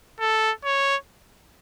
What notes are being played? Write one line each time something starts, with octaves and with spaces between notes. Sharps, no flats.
A4
C#5